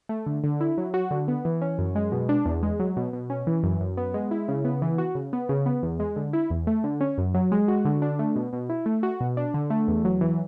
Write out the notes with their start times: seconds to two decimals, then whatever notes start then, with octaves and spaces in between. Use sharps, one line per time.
0.09 A3
0.26 D3
0.44 D3
0.61 E4
0.78 F#3
0.94 F#4
1.11 D3
1.28 B3
1.45 E3
1.61 C#4
1.79 F#2
1.95 G#3
2.12 B2
2.29 D4
2.46 E2
2.63 G#3
2.79 F#3
2.97 B2
3.13 B2
3.30 C#4
3.47 E3
3.63 F#2
3.80 F#2
3.97 B3
4.14 G#3
4.31 E4
4.48 C#3
4.65 B3
4.82 E3
4.98 F#4
5.15 C#3
5.33 B3
5.49 C#3
5.66 B3
5.83 E2
6.00 G#3
6.16 D3
6.33 E4
6.50 E2
6.67 A3
6.84 D3
7.01 C#4
7.18 F#2
7.34 F#3
7.52 G#3
7.68 F#4
7.85 D3
8.02 D4
8.19 A3
8.36 B2
8.53 B2
8.70 E4
8.86 A3
9.03 F#4
9.20 B2
9.37 D4
9.54 D3
9.70 A3
9.88 E2
10.05 F#3
10.21 E3